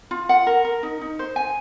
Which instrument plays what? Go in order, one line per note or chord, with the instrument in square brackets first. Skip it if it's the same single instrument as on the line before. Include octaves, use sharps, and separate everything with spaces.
[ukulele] F4
F#5
A#4
A#4
D#4
D#4
C5
G#5